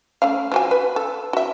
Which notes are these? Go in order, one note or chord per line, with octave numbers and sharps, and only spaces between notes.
A3 C#4 F5
F3 F#4 G#5
B4
A4
F#4 E5